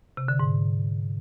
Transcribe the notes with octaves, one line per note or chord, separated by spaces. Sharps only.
C3
D3
G#2